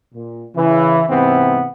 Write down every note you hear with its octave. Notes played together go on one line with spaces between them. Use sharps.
A#2
C#3 E3
G#2 C3 E3 B3 C4